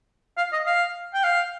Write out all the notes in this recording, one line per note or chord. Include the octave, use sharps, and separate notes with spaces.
F5
D#5
F5
G5
F5